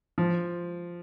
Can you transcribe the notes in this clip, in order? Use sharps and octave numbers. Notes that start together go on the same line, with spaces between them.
F3